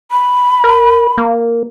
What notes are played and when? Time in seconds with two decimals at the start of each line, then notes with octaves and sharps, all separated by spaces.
0.11 B5
0.64 A#4
1.18 A#3